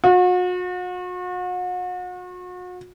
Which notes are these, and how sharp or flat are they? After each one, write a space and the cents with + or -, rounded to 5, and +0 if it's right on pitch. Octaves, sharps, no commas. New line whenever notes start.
F#4 -40